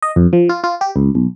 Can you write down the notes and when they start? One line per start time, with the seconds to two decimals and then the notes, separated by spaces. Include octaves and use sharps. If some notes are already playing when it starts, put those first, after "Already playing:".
0.02 D#5
0.16 F2
0.33 F3
0.49 F4
0.64 F4
0.81 G4
0.96 C#2
1.15 B1